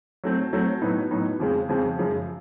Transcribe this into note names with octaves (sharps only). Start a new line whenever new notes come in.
F#3 A3 C4
F#3 A3 C4
A2 F#3 B3 D#4
A2 F#3 B3 D#4
F2 C#3 F3 G#3 C4
F2 C#3 F3 G#3 C4
F#2 C#3 F3 G#3